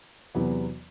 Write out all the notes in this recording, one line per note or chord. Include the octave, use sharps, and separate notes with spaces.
E2 C3 F#3 B3